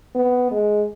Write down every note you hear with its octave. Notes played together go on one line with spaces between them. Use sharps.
B3
G#3